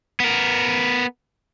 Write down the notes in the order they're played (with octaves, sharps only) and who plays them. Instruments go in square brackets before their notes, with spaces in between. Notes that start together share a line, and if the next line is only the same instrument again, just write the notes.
[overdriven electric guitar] B3 A#4